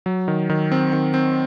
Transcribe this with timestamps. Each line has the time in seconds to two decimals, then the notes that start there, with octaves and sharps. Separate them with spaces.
0.06 F#3
0.28 D#3
0.50 D#3
0.72 C4
0.93 D#3
1.14 C4